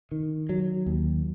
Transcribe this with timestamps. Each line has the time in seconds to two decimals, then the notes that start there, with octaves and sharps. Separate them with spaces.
0.12 D#3
0.49 F#3
0.86 D#2